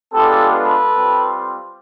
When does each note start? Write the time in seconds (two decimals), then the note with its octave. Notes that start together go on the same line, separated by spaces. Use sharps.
0.13 G#3 B3 D4 F4 G4 A4
0.52 A4 B4
0.92 G3 C4 F4